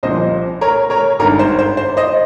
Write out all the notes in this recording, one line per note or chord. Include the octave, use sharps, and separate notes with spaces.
C2 A#2 F3 C5 D#5
A#4 C#5
A#4 C#5
G#1 G2 D#3 A#4
C5
C5
C5
C5 D#5